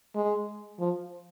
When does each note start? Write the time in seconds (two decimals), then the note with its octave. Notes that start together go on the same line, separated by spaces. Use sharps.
0.15 G#3
0.80 F3